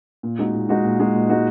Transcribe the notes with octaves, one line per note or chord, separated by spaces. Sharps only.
A#2
G#3 D#4 F#4
A#2
G#3 D#4 F#4
A#2
G#3 D#4 F#4
A#2
G#3 D#4 F#4